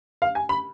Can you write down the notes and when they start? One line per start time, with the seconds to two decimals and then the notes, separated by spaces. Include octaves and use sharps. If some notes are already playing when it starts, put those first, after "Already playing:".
0.22 F5
0.35 G#5
0.49 B5